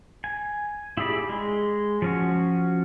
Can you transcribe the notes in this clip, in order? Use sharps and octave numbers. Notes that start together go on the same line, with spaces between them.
G#5
E4 G4 G#4 D5 B5
G#3
F3 C#4 F#4